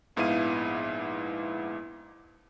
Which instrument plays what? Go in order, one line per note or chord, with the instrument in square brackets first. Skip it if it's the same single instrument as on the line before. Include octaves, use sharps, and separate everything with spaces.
[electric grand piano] A#1 G#2 B3 E4 F5 D#7